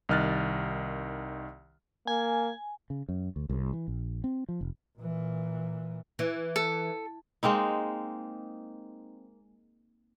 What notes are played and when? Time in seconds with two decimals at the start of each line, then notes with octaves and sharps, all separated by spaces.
0.09 C2 D#3 D#5 F6 F#6 A6
2.07 A#3 G#5
2.90 C#3
3.09 F#2
3.36 D2
3.49 C2
3.73 E3
3.88 A#1
4.24 C4
4.49 F3
4.61 F1
4.99 A#2 E3
6.19 E3
6.56 A4
7.43 G#3 A#3 C4 D#4